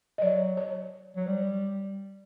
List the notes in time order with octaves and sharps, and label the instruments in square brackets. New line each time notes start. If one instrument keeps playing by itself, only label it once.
[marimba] D#5
[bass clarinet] F#3 [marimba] D5
[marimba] C#5
[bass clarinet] F#3
G3